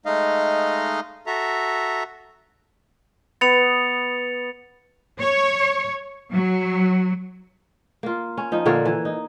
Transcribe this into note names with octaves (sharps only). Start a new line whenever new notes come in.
G#3 A3 D#4 D#5 F5
F#4 A4 E5 A#5
B3 A6 C#7 F7
C#5
F#3
A#3 F4
C#4
F3 D#4
A#2 D3 A#3 C#5
E3
D#4